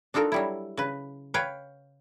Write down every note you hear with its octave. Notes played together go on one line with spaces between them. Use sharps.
D4 D#4 F4 A4 A#4
F#3 G3 E4
C#3 B4
B4 C#5 F5 G5